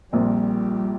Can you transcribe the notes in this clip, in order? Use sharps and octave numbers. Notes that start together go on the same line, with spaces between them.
A#1 A#2 F3 G3 C4